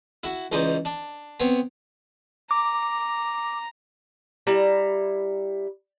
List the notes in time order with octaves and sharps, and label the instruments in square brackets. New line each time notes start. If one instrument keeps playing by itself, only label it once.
[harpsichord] E4 F#4
C#2 E3 D#4 C5 D5
D4
B3 C4 C#5
[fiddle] A#5 [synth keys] D6
[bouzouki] G3 E4 A#5